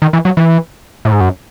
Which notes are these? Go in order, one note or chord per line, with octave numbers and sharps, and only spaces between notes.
D#3
E3
F#3
E3
A2
G#2
F#2